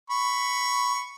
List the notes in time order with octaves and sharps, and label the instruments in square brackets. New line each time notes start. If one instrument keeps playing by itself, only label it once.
[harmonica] B5 C#6